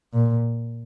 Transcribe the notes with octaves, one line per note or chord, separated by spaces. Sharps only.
A#2